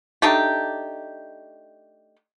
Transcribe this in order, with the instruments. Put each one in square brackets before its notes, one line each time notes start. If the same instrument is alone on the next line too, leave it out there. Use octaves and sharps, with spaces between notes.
[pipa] A3 D4 D#4 G4